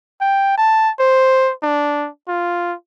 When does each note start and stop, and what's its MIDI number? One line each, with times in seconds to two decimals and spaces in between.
0.21 0.56 79
0.58 0.90 81
1.00 1.52 72
1.63 2.08 62
2.28 2.74 65